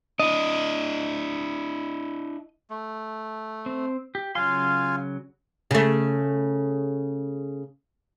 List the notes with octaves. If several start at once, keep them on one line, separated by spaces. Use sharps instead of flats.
D4 E4 D#5
A3
C4
G4
C#3 F#3 F4 F5 G#5 C6
C#3 A3